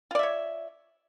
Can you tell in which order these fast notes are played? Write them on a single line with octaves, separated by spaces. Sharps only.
F4 D5 E5 C#5